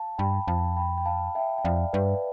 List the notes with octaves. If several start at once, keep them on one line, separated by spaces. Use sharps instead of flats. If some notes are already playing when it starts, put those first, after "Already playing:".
Already playing: F5 A5
G2 G5 B5
F2 F5 A5
G5 B5
G5
F5 A5
E5 G5
G5
F2 D5 F5
G2 B4 D5